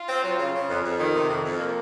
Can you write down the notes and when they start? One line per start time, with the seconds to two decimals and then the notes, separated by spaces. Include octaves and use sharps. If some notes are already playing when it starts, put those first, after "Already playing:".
Already playing: F4
0.08 C4
0.24 F#3
0.38 C#3
0.54 C#3
0.69 F2
0.84 F2
0.99 D#3
1.15 C3
1.29 F2
1.44 F2
1.59 A#3